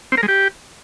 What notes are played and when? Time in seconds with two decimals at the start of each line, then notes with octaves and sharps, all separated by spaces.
0.12 C4
0.17 A#4
0.23 G#3
0.28 G4